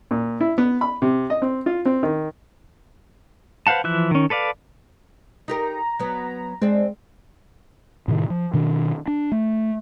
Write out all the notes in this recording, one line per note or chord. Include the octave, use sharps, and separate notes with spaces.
A#2
E4
B3
B5
C3
D#5
C4
F4
C4
D#3
B4 C5 F5 F#5 A5
E3 F3 E5 F#6
D#3 C#4
A4 B4 D5 F5
D#4 G4 A#4 A#5
F#3 B3
G#3 C4 D4
A2 C3 D#3
F3
B2 D#3 D4
D4
A3